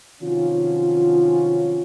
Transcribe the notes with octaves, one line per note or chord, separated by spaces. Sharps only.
C3 D#3 F3 F#3 C#4 F4